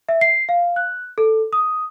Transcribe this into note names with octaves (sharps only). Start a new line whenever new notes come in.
E5
C7
F5
F#6
A4
D#6